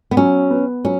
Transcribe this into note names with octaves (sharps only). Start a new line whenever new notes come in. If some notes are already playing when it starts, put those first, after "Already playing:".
B3
F#3 C#4
B3
F#3 C#4